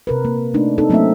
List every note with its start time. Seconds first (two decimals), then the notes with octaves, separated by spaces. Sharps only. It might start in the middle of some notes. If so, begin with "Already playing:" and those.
0.07 C3 A#4 B4
0.25 A#3
0.54 A3 D4 D#4
0.78 C4 D#4 A4
0.90 F#3 A3 A#3 C4 C#4 E5